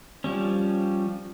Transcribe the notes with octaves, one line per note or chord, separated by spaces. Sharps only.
F3 G3 C#4